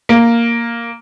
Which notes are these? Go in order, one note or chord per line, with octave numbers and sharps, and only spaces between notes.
A#3